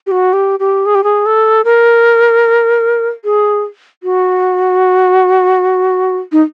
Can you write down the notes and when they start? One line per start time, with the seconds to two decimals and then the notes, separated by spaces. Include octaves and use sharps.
0.07 G4
0.11 F#4
0.33 G4
0.60 G4
0.86 G#4
0.95 G4
1.04 G#4
1.26 A4
1.65 A#4
3.24 G#4
4.03 F#4
6.32 D#4